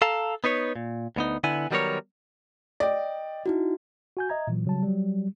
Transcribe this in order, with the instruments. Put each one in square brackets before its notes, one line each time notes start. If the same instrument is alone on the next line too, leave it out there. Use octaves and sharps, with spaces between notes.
[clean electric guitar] A4 F5 A5 A#5
B3 D#4 B4 C#5
A#2
D2 B3 D#4
D3 B3 E4 G#5
D#3 F#3 G3 B3 A#4 C#5
[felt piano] D5 [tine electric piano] D#5 G5
[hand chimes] D#4 E4 F#4
[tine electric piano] F#4 G#5 G6
D#5 E5 A#5 G#6
A#2 E3 F#3
C#3 F#3 G3 A5
F#3 G3